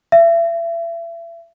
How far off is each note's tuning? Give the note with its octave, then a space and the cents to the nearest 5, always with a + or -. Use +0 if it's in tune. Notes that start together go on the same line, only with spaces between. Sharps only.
E5 +35